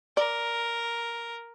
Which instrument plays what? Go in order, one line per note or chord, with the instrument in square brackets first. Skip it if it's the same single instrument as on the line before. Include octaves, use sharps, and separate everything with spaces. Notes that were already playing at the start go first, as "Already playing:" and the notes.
[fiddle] A#4 [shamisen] D5